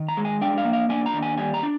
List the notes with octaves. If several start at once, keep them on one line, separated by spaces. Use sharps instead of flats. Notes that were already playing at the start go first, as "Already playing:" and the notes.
Already playing: D#3
A#5
G#3
G#5
D4 G5
F5
A#3
F5
D4 G#5
A#5
D#2
G#5
G3 G#5
A#5
D4